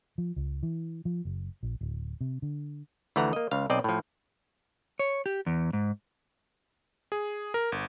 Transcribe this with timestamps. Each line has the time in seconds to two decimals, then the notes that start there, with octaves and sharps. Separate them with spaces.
0.18 F3
0.36 C#2
0.63 E3
1.05 F3
1.25 F#1
1.63 A#1
1.81 D1
2.21 C3
2.42 D3
3.16 D2 E3 F3 A3 F#5 A#5
3.33 A#3 D#5
3.51 C#2 F5
3.70 B1 C4 D5 D#5
3.84 A2 F3
4.99 C#5
5.26 G4
5.46 E2
5.73 G#2
7.12 G#4
7.54 A#4
7.72 G1